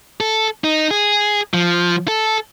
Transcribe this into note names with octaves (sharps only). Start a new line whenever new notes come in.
A4
D#4
G#4
F3
A4